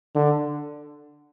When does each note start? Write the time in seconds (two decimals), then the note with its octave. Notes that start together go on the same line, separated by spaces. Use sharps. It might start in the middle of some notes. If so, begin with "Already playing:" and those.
0.15 D3